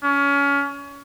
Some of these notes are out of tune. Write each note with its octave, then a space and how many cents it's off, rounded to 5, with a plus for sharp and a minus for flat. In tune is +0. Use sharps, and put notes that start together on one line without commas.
C#4 +25